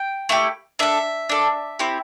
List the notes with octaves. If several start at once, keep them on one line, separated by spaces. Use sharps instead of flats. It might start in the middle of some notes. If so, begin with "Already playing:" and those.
Already playing: G5
A3 E4 G4
D4 A4 E5
D4 A4
C4 E4 G4